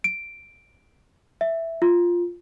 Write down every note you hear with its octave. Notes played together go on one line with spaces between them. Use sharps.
D7
E5
F4